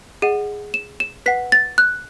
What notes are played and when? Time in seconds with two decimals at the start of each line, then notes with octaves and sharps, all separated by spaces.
0.22 G#4 D#5 F#5 D#7
0.74 E7
1.00 E7
1.26 B4 F#5 B6
1.52 A6
1.78 F#6